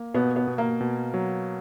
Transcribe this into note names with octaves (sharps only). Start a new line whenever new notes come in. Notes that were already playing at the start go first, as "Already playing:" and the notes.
Already playing: A#3
B2 B3
B3
B2
A#3
B2
F#3